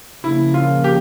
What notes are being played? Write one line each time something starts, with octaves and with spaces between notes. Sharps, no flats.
C#3 F3 A#3 E4
F4
G4